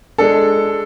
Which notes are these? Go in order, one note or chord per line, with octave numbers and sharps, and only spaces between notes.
G#3 D4 A4